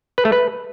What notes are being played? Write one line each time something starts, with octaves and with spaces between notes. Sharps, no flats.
B4
A3
B4